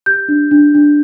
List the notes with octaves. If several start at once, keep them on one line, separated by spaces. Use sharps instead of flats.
G4 G6
D4
D4
D4